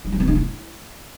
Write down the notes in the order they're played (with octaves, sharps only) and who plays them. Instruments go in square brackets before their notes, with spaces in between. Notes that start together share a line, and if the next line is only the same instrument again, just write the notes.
[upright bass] F#3
F3
C4
D#4
E4